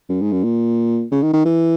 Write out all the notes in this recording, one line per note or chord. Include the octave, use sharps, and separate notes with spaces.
F#2
G#2
F#2
A#2
C#3
D#3
D#3
E3